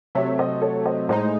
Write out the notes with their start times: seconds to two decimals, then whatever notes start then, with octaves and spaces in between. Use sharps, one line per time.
0.15 C3 F#3 A3 C#5 E5
0.39 C5 D#5
0.62 A4 C#5
0.86 C5 D#5
1.09 A2 G#3 D#4 C5 D#5